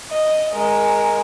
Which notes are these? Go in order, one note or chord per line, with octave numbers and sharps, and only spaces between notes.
D#5
G#3 A#4